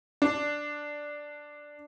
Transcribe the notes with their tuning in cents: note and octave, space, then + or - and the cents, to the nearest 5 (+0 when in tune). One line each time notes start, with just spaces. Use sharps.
D4 +0